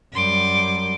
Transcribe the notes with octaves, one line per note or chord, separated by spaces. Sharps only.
F#2 G3 C6 D6